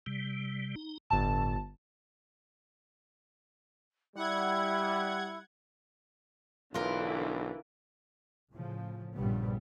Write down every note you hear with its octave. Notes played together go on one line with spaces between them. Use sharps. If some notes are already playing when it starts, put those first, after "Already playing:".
C3 G3
D#4
G1 A2 A5
G3 E4 F#5 G#6
B1 D3 E3 F4 A#4
A2 C#3 F3
A#1 G2 A#2 C#3 G3 B3